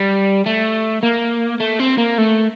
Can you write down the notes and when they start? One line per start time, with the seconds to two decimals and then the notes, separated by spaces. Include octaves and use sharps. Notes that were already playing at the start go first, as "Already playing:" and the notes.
Already playing: G3
0.46 A3
1.03 A#3
1.60 A3
1.79 C4
1.98 A#3
2.18 A3